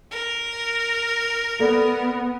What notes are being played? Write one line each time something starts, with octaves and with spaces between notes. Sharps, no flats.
A#4
B3 A4 D5